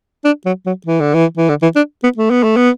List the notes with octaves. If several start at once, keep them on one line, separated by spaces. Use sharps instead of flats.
D4
F#3
F#3
E3
D3
E3
E3
D3
E3
D4
B3
A3
B3
A3
B3